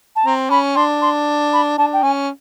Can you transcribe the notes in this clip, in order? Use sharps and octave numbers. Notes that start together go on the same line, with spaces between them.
A5
C4 A#5
C#4 B5
D4 C6
C6
B5
D4 A5
G5
C#4 G#5